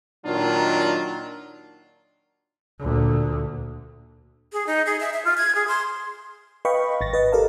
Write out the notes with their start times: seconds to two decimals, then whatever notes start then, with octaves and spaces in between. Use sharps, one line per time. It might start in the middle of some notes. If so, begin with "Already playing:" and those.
0.25 A#2 D#3 F#3 D4 D#4 F4
2.79 D2 A#2
4.53 G#4
4.67 D#4
4.86 G#4
5.00 E5
5.14 E5
5.25 F4
5.37 G#6
5.55 G#4
5.68 C6
6.65 B4 D#5 F5 G5 B5 C#6
7.01 G#1 A6 A#6
7.13 B4 D#5
7.32 G4 A4 A#4 D5 F5 A5